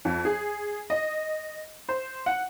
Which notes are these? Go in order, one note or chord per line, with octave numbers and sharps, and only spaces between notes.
F2
G#4
D#5
C5
F#5